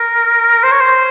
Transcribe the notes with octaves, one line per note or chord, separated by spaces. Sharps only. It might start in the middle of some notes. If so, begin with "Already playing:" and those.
Already playing: A#4
C5
C#5
C5